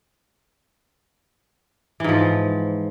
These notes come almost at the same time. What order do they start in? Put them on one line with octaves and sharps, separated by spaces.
E3 G#2 F3